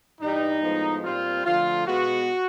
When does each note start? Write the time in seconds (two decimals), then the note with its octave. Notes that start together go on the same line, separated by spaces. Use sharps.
0.20 G2 E3 G3 D#4
0.61 A2 F3 G#3 B3
1.04 A#2 G3 C4 F4
1.44 D3 F3 A3 F4
1.87 B2 G#3 B3 F#4